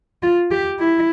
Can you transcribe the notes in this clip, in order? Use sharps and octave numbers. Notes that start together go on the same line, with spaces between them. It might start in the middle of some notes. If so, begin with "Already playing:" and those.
F4
G4
E4